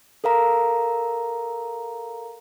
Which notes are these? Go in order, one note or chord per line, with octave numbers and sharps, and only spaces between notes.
A4 A#4 F5 A#5